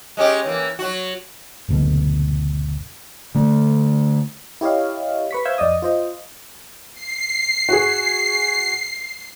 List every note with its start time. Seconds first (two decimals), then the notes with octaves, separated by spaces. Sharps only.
0.17 G#3 C#4 G4
0.46 E3 A#3
0.79 F#3 F#4
1.69 F#1 D2 B2
3.35 D3 A3
4.61 E4 G4 C#5 D#5 F5
5.31 B4 C#6 B6
5.45 C5 E5 F5 E6 G6 G#6
5.58 F2 D5 D#5 D#6
5.82 F4 C5 D#5
6.93 C7
7.69 F#4 G#4